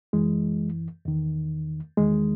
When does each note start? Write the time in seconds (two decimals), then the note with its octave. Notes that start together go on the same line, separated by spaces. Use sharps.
0.13 F#2 E3 G#3
1.05 E2 D#3
1.97 E2 D#3 G#3